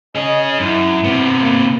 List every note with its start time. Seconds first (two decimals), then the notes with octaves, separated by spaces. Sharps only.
0.16 C#4 G#4 D#5
0.60 F#2 E4
1.04 C3 B3
1.41 A#3